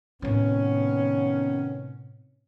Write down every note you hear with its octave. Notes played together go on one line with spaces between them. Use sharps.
A2 C3 D#3 B3 C#4